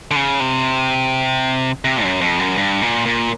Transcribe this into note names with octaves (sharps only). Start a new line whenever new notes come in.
D3
C#3
C3
C3
F#2
F2
F#2
G2
A#2
A#2